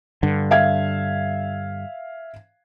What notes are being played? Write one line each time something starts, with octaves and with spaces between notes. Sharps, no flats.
G2 D3
E5 F5 G#6